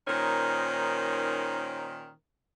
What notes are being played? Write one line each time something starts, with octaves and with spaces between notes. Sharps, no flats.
A#2 D#3 C#4 D#4 A#4 C5